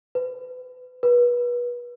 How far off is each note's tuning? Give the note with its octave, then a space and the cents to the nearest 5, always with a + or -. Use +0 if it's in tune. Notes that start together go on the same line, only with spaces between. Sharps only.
B4 +35
B4 -30